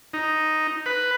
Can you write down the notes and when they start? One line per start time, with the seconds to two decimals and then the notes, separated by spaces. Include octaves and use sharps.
0.13 D#4
0.86 B4